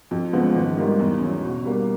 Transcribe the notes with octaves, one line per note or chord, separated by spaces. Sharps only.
F2
C#3 F3 G#3 B3
G#1
G#2 D#3 G3 A#3
E2
C#3 F#3
B2
G3 A#3